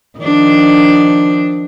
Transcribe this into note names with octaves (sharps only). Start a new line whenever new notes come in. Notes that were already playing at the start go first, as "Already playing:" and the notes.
D#3 F3 D4